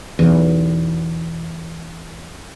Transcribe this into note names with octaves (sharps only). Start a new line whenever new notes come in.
B1 E2